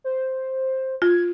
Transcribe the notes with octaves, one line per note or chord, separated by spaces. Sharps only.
C5
F4 G#6